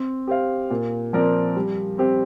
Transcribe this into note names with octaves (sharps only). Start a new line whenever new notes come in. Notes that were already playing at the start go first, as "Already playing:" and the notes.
Already playing: C4
G4 C5 F5
A#2
F3 C4 A#4 D5
G3
C4 G4 C5